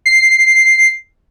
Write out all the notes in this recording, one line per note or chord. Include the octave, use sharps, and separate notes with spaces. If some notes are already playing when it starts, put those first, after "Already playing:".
C7